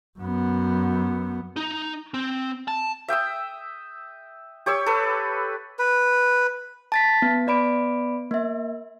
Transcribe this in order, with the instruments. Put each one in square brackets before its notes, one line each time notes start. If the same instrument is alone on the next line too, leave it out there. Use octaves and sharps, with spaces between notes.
[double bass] F#2 B3
[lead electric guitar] D#4
C4
A5
[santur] E5 G5 D#6 E6
G4 C#5 C#6 E6
A4 B4
[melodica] B4
[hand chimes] A5 A6 B6
B3
B3 D5 B5 D7
A#3 E5